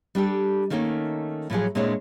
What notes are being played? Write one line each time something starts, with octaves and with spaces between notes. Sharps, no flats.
G3 D4 G4 A4
D#3 A3 A#3 C#4 D#4
A2 F3 F#3 G#4
A#2 G#3 C4 D4 E4 C#5